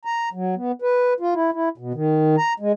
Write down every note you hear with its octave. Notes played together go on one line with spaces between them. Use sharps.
A#5
F#3
B3
B4
F4
E4
E4
B2
D#3
A#5
G#3